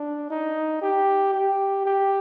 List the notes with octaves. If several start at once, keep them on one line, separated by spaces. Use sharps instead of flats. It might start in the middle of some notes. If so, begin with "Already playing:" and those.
Already playing: D4
D#4
G4
G4
G4